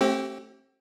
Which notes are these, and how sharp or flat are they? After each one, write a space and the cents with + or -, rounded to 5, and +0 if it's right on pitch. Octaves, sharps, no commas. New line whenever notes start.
A3 +0 C4 +35 G4 -25